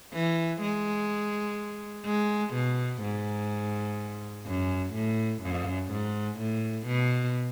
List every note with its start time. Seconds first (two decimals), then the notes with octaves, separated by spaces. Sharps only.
0.13 E3
0.61 G#3
2.05 G#3
2.54 B2
3.02 G#2
4.47 F#2
4.94 A2
5.43 F#2
5.91 G#2
6.39 A2
6.86 B2